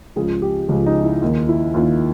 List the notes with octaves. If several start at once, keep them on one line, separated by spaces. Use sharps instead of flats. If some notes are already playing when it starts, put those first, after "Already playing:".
C#2 C#3 F3 G#4
G4
C#2 C#3 F3 F4
D#4
E4
D#2 D#3
E4
D#2 F4
D#3